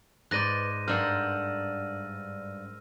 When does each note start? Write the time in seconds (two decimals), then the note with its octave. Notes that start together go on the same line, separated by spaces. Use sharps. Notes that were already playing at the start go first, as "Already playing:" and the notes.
0.31 G#2 B4 D5 F#6 A#6 D#7
0.88 G2 D4 A#4 C5 F#5 E6 F6